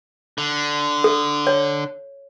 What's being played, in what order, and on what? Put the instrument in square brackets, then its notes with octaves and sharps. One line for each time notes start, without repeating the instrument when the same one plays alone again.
[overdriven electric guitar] D3
[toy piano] A4
C#5